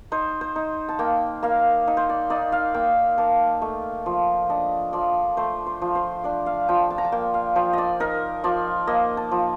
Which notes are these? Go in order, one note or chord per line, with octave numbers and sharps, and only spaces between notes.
D#4 C5
C5
D#4
A5
A#3 G5
A#3 F5
D#4
C5
D5
D#4 D5
F5
A#3 G5
A#3 A5
A3
F3
D4 D#5
F3 D5
A3 C5
C5
F3
C5
D4 D5
F5
F3 G5
A5
A#5
A5
A#3 G5
F5
F3 G5
D5 D#5
D#4 A#4
F3 D5
A#3 D#5
A5
F3